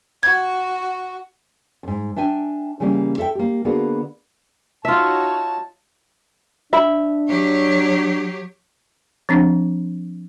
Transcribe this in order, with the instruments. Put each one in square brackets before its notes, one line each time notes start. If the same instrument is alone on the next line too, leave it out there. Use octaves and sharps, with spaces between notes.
[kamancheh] F#4 [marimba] G#6
[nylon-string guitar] F2 G#2
D4 E5 G5 G#5
C#3 E3 G3 A#3 C#4
A4 E5 F5 G5
A#3 G4
D3 A#3 B3 F#4 G#4 A#4
[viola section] D#4 F#4 C#5 [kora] F4 E5 [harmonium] A5
[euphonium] D4 [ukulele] E5 B5
[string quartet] F#3 G4 C#5
[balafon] F3 C4 D4